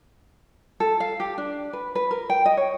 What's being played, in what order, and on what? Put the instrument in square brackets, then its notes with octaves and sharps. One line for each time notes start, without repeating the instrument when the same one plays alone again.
[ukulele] A4
F5
G4
D4
B4
B4
A#4
G5
D#5
C#5